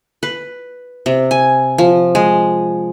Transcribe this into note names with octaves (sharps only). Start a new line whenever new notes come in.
B4
C3
G#5
F3
G#3